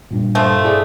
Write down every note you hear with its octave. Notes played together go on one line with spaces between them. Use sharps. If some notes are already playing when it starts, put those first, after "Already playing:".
G2 A#2
F3 A3
E4 G#4 D5